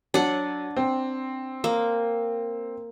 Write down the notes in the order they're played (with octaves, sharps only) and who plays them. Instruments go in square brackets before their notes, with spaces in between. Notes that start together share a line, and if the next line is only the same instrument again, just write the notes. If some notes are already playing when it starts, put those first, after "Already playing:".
[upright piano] F#3 [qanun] D4 F#5
[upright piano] C4
[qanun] A#3